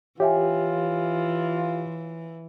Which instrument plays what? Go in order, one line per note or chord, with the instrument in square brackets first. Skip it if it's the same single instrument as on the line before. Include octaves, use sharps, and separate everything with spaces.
[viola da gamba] E3 [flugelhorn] F4 [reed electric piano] G4 [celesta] C#5 E5 G#5